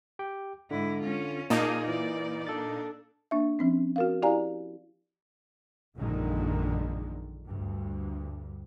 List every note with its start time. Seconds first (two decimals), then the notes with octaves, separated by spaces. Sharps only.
0.19 G4 G5
0.71 G#2 D3 E4
1.02 C#4 F4
1.50 A#2 A#3 D#4 F4 G#4 A5 D6
1.88 E3 D5
2.47 D4 A4 A6
3.31 A#3 D4 E5
3.59 F3 C4 C#4
3.96 F#4 A#4 F5
4.22 E4 G4 D5 F5 G#5 A#5
5.97 A#1 F#2 A#2 D3 D#3 G#3
7.48 D2 G2